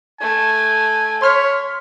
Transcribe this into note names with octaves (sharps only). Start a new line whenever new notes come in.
A3 G#5
C#5 C6 F6 B6